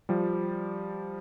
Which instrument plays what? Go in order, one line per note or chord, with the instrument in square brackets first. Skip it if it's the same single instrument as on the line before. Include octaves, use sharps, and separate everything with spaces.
[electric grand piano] F3 G3